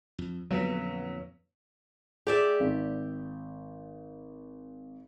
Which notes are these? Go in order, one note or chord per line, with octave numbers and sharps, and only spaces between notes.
F2
F2 A#2 D3 F#3 B3 B4 B6
G4 G#4 D5 E5
G#1